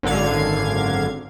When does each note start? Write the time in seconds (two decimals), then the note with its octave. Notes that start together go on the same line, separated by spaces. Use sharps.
0.03 G#1 F#2 D3 F5 G#6